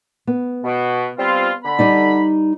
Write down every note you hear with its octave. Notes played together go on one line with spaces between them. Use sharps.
B3
B2
G3 C4 F4
D3 B5
G3 D#4 D5